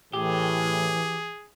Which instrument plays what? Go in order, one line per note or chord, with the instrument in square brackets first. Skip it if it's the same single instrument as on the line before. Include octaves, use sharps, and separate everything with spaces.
[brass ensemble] A2 [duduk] E3 [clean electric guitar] G4 [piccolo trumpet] G#4